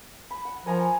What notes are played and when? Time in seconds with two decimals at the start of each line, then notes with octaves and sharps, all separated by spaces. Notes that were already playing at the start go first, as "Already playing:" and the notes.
0.31 B5
0.45 F#5
0.66 F3 A#4 G#5 A#5
0.80 G#5